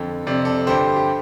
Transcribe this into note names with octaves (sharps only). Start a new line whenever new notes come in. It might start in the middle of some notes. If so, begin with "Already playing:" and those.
Already playing: F2 D3
F2 C3 D5
A4 D5
G2 D3 G4 C5
G4